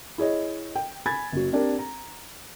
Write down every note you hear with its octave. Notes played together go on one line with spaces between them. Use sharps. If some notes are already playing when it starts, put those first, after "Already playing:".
E4 G#4 C#5 D#5
G5
G#5 B5 G#6 A6
F#1 F#3
C4 D4 G4 A#4
A#5